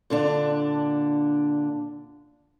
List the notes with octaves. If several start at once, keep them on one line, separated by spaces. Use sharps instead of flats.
A#2 D3 D4